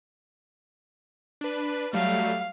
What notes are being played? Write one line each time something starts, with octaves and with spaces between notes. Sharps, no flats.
D4 B4
F#3 G3 A3 F5